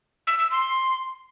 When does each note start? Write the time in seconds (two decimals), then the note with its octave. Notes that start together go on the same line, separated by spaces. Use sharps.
0.27 E6
0.39 E6
0.51 C6